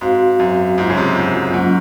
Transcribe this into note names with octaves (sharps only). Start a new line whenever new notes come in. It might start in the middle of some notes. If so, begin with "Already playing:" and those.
G#2 C4 F#4 C5 F5
F#2
G#2 A#3 F4 C5
C#3
G#2 C3
G#2
F#2
G#2 F#3 A#3 C#4 F4